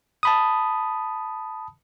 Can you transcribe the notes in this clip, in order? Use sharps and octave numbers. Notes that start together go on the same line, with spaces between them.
A5 B5 D#6